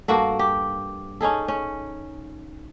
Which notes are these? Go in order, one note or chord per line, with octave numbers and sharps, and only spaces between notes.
G2 A#3 F#4 A4
G4
C#4 D#4 G#4 A4
C#4